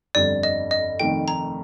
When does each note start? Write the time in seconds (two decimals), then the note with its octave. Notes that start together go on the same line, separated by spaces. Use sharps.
0.15 G1 F2 D3 G3 D5
0.43 D#5
0.71 D#5
1.00 F1 F2 D#3 A3 D#4 G5
1.28 A#5